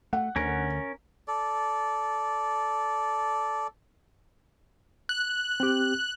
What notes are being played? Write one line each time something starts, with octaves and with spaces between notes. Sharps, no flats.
A3 F#5
D2 D3 C#4 A#4
A4 D5
F#6
C4 G4